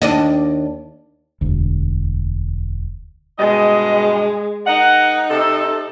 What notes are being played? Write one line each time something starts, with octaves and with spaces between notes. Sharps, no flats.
D#2 D4 D#5
E1 D2
G2 B2 G#3 D#5
D#4 A#4 D#5 F#5
C3 A4